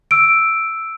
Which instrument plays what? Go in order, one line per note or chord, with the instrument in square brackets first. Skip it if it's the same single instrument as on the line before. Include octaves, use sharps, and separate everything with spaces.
[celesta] E6 D7